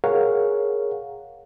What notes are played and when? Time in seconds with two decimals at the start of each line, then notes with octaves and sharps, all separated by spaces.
0.04 G#4 A#4 C#5 F5 F#5